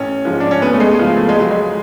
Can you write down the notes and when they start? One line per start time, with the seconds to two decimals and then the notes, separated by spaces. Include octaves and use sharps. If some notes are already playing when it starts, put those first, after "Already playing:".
Already playing: A1 C#4
0.25 G#2 F3
0.40 D4
0.51 C#4
0.62 D2 B3
0.73 A3
0.80 G#3
0.99 C#3 F3
1.17 A3
1.29 G#3
1.35 C#2 F#3
1.51 G#3